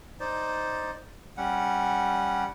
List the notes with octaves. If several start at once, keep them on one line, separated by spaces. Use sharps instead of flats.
D#4 C5 D5
G3 C#4 F#5